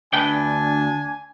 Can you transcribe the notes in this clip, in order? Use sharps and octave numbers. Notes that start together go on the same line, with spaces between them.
D2 D4 B4 G5 G#5